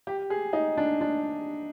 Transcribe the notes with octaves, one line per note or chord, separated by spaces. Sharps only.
G4
G#4
D#4
D4
D4